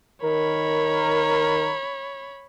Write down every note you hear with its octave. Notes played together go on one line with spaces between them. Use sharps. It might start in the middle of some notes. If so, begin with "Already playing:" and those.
D#3 A#4 C#5 B5